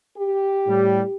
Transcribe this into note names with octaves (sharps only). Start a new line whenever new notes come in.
G4
A2 G3